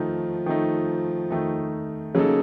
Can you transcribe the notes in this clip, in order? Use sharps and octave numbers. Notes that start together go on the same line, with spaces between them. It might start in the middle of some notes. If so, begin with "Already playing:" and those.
Already playing: D#3 F3 A3 D#4
D#3 A3 D#4
D#3 A3 D#4
C#3 F#3 A#3 D#4 A4